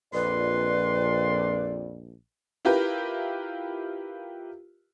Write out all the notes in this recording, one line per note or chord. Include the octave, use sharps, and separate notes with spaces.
A#1 F2 B4 D5 C6
E4 F4 G4 A#4 B4